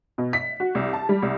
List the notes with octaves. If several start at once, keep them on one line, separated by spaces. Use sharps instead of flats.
B2
B6
F#4
C2
A5
G3
C2